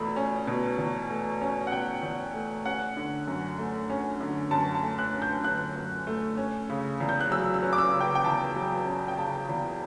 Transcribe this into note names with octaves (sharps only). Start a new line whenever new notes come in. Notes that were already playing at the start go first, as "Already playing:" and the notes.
Already playing: E2 B2 A3 B5
C#4
B2
E2
A3
C#4
F#5
B2 G5
E2
A3
C#4 F#5
D3
F#2
A3
C#4
D3
F#2 A5
A5
A3
F#6
C#4
G6
D3 F#6
F#2
A3
C#4
C#3
E2
G6
F#6
F#3 E6
E6
C#4
D6
E6
C#3
G5
G5
E2 A5
F#3
C#4
G5
C#3 A5
E2